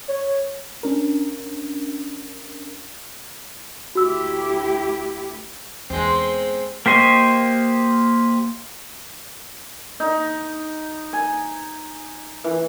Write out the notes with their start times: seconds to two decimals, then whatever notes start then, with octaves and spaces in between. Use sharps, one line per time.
0.08 C#5
0.83 C#4 D4 A#4
3.95 D2 E4 F#4 G4 E6
5.90 E2 G#3 C4
6.86 A#3 G4 C5 D#5 C#6
10.00 D#4
11.13 G#5
12.44 E3